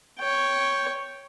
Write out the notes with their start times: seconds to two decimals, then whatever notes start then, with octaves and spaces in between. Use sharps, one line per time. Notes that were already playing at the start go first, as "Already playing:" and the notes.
0.19 C#5 G5